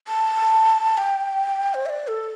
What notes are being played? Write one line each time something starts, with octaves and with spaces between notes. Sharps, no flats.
A5
G5
C5
E5
D5
A4